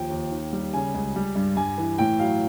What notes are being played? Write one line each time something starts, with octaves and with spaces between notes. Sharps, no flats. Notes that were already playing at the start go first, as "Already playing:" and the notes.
Already playing: D#2 F3 G5
D#2
D#3
G3
C#3 G#5
C#2
G3
G2
G2 G#5
E3
A2 G5
F#3 F5